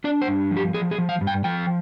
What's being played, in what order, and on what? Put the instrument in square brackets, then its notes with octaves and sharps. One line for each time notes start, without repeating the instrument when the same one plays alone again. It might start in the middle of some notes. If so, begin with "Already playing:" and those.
[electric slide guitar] D4 D5
C5
G2
F3
G4
F3 G#4
G#4
F3
F5
G2
G5
F3 G5